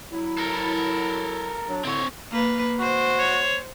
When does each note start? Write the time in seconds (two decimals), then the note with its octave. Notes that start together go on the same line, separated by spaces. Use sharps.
0.12 F#3 E4
0.38 A4 A#4
1.68 F#3 D4
1.85 A2 D3 C4 C#5
2.31 A#3 B4
2.80 F#4 C5
3.19 C#5